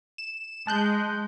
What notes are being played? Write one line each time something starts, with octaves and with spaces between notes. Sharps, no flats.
E7
G#3 A5 F#6 G6